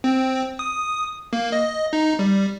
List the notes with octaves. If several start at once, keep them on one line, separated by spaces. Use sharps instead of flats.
C4
D#6
A#3
D#5
D#4
G3